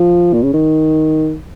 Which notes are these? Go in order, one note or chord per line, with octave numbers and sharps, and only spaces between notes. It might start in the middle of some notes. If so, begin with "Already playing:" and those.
Already playing: F3
A#2
C#3
D#3